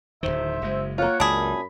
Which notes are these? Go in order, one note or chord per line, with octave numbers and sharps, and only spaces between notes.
D1 B1 D#3 C5 E5
F#1 C#3 G#3
A#3 F4 C#5 F#5
C#2 F#2 D4 G#4 B5